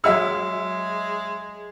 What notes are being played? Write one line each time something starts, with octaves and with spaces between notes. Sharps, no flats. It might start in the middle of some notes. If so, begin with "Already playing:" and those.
F#3 G#3 E5 E6